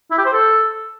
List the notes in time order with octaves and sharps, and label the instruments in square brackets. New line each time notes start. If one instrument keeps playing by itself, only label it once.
[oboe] E4
G4
C5
A4